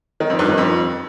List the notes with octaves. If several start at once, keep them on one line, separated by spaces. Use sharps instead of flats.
D#3
F2
G2
D#3
F2